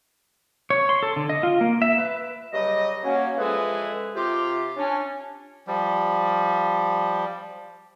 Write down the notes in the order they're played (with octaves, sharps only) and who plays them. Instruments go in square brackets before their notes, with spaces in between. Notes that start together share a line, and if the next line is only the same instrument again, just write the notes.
[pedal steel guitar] C#5
C6
A4
D3
D#5
F4
A#3
E5
B4
[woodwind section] G2 C#3 F#3 G3 G4 D#5
F#3 A#3 C#4
E3 F3 G#3 G#4 A4 B4
C3 F4 G4
C#4 D4
[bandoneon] F3 G3